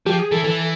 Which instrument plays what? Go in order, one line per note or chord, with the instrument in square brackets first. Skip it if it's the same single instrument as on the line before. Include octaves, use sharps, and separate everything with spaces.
[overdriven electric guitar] F3 [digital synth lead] G4
[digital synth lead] G#4
[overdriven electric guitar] E3 [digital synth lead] A4
[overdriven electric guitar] E3 [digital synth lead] A4